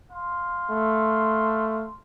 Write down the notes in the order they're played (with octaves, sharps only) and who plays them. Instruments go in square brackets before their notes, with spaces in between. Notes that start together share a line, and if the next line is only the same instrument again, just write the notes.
[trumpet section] F5 C6
[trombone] A3